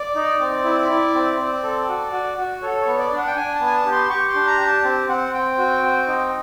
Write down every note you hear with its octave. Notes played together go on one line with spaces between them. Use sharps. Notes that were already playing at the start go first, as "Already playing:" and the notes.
Already playing: D5
D#4
C4
E4
E4
C4
C4
A4
F#4
F#4
F#4
A4 C#5
C#5
B3
D5
D4
F#5
G5
D4 G#5
A5
B3
G#5
A5
G4
C6
G4 C#6
C6
D4
A#5
G4
A5
C4
C4 F#5
C4 G5
F#4
C4
D#4